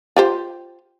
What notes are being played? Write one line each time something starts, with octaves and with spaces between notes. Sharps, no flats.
F4 G4 C5